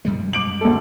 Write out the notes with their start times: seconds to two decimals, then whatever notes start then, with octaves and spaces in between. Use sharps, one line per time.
0.05 F#2 G3 G#3
0.33 D6 D7 F#7
0.61 D2 A4